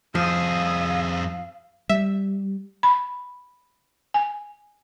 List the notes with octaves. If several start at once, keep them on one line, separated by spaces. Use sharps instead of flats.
F2 F3 G#4 F5 D#6 E6
G3 E5
B5
G#5